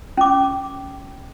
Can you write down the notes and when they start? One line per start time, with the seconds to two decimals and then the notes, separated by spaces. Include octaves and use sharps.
0.17 C#4 D6